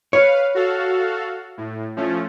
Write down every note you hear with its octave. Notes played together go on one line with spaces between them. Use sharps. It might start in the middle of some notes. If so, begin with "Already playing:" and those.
B4 C#5 F5
F#4 A4 F5
A2
F3 A3 C#4